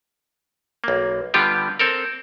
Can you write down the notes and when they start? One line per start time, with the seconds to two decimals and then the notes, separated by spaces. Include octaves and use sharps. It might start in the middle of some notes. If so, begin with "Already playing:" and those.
0.84 B1 A#3
1.34 D3 G3 B3 F4 G4
1.79 C4 A4 A#4